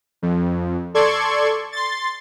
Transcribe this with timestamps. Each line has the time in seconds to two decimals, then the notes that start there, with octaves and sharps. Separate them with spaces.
0.22 F2
0.94 A4 D5 C6 C#6 G#6
1.72 C6 A6